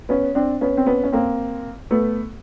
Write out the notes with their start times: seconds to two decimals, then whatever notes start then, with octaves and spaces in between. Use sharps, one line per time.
0.09 B3 C#4
0.35 C4 D4
0.61 B3 C#4
0.77 C4
0.87 B3 C#4
1.04 C#4
1.12 A#3 C4
1.91 A3 B3